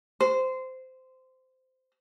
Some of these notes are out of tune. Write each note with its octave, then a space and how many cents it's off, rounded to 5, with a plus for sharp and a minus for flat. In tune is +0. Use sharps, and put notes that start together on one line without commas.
C5 -15